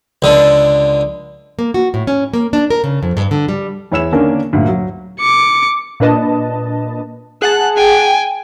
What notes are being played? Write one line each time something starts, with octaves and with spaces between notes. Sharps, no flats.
C#2 D3
A#3
F#4
A2
C#4
A#3
D4
A#4
C#3
F2
G2
D3
G3
E2 E4 C#5 E6 E7
D3 D#3 A#3 C#4 D4 A#4
D2 A#2
F#3
D6 C#7
A#2 D4 B4 D#5 A5
G#4 F#5 A5 F#6
G5 G#5